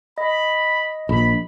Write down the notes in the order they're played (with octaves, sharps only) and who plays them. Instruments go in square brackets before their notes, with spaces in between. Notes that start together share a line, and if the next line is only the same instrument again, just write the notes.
[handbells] D#5 [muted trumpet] B5
[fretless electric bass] A#1 [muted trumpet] B5